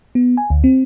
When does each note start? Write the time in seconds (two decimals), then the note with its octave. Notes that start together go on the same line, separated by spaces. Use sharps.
0.15 B3
0.37 G#5
0.50 D2
0.64 C4